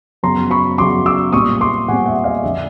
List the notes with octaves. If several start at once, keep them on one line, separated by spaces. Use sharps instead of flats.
F#2 C#3 F#3 B3 A#5 C6
B5 C#6
F#2 C#3 F#3 B3 C6 D6
D6 E6
A#2 G3 C4 C#6 D#6
C6 D6
A#2 G3 C4 F#5 G#5
E5 F#5
D#5 F5
F2 D3 F3 D5 E5